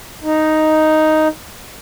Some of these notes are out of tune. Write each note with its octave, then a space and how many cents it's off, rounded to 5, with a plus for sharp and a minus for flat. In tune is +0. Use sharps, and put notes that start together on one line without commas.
D#4 +0